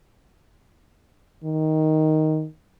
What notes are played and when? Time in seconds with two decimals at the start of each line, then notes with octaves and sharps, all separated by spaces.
1.44 D#3